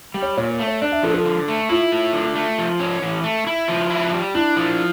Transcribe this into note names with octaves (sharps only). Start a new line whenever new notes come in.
G3
C#5
A#2 C#5
C#5
A3
C#5
D4 D5
E5
F3 A4
A4
D3
A3
E4 F4
A3
D3
A3
F3
C#4
E3
A3
E4
F3
E4
G3
D4 E4
F3